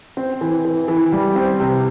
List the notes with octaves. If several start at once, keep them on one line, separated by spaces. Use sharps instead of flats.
C4
E3
E3
E3
G3
C4
C3